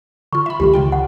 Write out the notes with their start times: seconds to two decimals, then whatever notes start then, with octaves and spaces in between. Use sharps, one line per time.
0.33 D3 F4 C#6
0.46 E5 B5
0.60 C#2 D3 D#3 G4
0.74 C#3 F4 G5
0.92 F#5